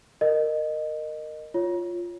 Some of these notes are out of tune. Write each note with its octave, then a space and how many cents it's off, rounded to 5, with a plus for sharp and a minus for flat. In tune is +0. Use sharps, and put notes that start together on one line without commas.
A#4 -10 D#5 -20
F4 +0 C#5 +0